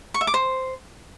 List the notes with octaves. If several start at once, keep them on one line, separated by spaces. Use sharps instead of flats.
C#6
E5
D6
C5